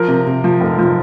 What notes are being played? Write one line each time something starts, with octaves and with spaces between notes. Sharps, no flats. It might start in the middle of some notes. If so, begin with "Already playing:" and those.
Already playing: F3 A#4
C3
C3
F3
F1
F3